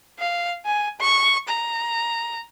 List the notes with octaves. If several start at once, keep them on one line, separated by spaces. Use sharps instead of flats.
F5
G#5
C#6
A#5